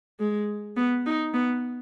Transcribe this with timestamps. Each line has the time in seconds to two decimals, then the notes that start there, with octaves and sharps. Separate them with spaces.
0.20 G#3
0.77 B3
1.06 D#4
1.34 B3